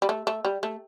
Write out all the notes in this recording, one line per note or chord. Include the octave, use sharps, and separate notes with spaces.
G3
A3
A3
G3
A3